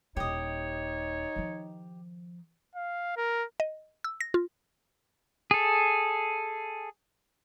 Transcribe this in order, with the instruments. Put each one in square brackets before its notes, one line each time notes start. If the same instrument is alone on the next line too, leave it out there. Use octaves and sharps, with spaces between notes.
[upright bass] D#1 E4 [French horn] D#4 [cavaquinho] G4 D#5 [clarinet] C#5
[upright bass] D#3 F3
[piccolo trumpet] F5
A#4
[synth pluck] D#5
E6
A#6
F4
[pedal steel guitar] G#4 A4